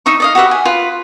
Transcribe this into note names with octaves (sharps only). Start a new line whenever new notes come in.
D#4 E5 C#6
D5 D#5 F5
F#4 G4 B4 E5
G#5
F4 B4